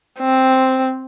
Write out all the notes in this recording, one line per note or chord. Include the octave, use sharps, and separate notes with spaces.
C4